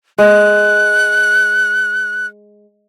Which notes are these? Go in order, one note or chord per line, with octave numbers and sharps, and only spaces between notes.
G#3 F#6